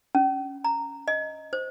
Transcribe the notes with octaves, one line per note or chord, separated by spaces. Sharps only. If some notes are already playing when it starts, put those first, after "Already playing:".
C#4
A#5
D#5
C5